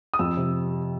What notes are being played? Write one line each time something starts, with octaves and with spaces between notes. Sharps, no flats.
D#6
F2 E6
C3